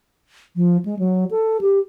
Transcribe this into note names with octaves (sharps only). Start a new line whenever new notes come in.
F3
G#3
F#3
A4
G4